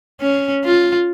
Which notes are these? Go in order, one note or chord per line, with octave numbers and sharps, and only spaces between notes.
C#4
F4